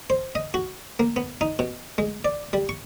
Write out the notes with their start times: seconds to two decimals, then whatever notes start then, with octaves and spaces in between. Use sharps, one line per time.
0.10 C5
0.35 D#5
0.54 F#4
0.99 A#3
1.16 B3
1.41 D#4
1.59 B2
1.98 G#3
2.25 D5
2.53 G3
2.69 C#6